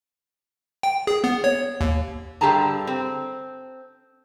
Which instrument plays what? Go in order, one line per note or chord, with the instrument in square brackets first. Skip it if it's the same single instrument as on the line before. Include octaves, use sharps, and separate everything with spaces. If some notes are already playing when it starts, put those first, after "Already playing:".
[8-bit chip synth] G5
G#4
B3
C#5
D#2
[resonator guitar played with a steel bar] G2 D3 G4 G#4 A5 A#5
C4